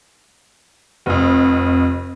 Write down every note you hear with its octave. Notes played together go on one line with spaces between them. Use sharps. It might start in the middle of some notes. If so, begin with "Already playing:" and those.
F1 F2